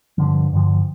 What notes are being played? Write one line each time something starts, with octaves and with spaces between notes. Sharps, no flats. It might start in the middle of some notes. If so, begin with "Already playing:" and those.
G2 D3 F3
G2 D3 F3